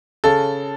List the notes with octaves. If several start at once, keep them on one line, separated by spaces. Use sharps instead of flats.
C#3 A4